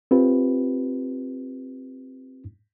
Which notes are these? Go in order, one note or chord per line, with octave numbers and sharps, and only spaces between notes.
C4 F4 G4 B4